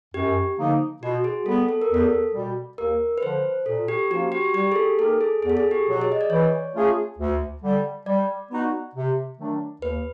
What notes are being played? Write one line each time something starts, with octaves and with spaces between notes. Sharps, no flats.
F#2 G4
D3 F3 A#3 D#4
B2 F#4
G#4
G3 B3 A4
A4
A#4
E2 A4
B2 G3
D#2 A#4
B4
D3 F3 C5
A#2 A4
G4
F3 A#3 C#4 F#4
G4
G3 G4
G#4
A4
A#3 D#4 G4 A4 A#4
G#4
E2 G#4
A4
G#4
G4
B2 F#3
G#4
D#5
D5
E3 C#5
A3 C#4 F4 G#4
D2
D3 G3
G3 D5
B3 D#4 F#4
C3
D#3 F#3 A3 D4
D#2 B4